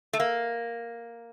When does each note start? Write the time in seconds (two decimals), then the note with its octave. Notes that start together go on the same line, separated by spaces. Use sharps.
0.13 A3
0.20 A#3